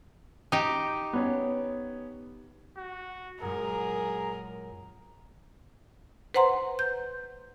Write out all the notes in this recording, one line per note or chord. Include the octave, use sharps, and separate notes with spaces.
D#4 G4
B3 C#4 C#5
F#4
F#2 A#2 G#3 G#4 A#4
B4 C5 F#5 A#5 C6
G6